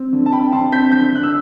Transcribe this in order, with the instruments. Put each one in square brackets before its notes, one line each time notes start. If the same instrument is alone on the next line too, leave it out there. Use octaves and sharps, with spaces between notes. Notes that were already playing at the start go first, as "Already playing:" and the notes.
Already playing: [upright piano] C4
D3
A5
C4 G5 B5
D3 A5 C6
C4 G6 B6
D3 G6 B6
D3 F#6
E6